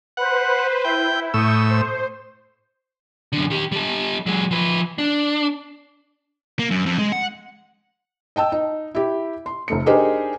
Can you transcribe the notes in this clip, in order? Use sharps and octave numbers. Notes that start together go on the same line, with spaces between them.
B4 C5 F#5
E4 G5
A2 C#6 D#6 E6 G6
C5
F#2 D3
D#3 G4
G3 A4
F#3 G#3
F3 B4
D4
A#3
F#2
F2
G#3
F#5
D#5 G5 A5 E6
D#4
E4 G4
C6
F1 A3 C#7
D4 D#4 G4 G#4 A#4 C5